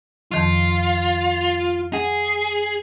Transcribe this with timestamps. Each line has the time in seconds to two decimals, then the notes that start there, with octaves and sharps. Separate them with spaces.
0.31 F2 D#3 F3 F4
1.93 G#4 F#5